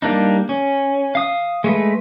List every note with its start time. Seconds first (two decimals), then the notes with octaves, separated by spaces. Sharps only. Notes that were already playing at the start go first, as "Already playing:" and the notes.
0.02 G3 A#3 D4 D#4
0.49 C#4
1.15 F5 D#6
1.64 G#3 A3 B4